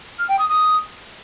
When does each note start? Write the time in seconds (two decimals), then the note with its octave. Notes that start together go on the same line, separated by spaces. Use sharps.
0.18 F6
0.28 G5
0.38 D#6
0.49 D#6